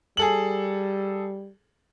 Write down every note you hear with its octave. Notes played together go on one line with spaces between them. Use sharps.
G3 G#4 A4 F#7